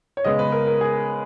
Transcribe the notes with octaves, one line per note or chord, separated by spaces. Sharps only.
C#5
C#3 G#3 B3 D#5
B4
A#4
A#4
G#4